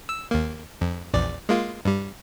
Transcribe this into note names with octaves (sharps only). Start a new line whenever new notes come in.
E6
D#2 A#3
F2
A#1 E2 D5
G#3 A#3 F4
G2 G3